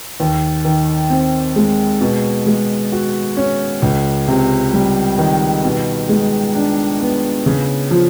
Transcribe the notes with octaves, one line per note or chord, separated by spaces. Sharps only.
D#2
D#3
C4
G#3
B2
G#3
F#4
C#4
C#2
C3
G3
D#3
B2
G#3
D4
B3
C#3
F3